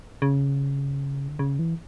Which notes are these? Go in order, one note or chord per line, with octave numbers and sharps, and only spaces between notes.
C#3
D3
C#3
E3